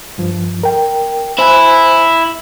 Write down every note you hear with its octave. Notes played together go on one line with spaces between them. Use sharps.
G2 F3
A#4 G5
E4 C5 G#5 F#6